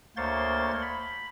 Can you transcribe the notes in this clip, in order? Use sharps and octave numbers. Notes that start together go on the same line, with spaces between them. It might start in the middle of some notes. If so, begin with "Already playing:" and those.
D2 A#3 C5 C#5 C6 A6
B5